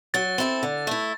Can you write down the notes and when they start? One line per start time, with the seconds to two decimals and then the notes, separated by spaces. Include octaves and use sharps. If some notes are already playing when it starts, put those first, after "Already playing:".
0.14 F#3 A6
0.38 C4 E4 A4
0.63 D3
0.87 A3 E4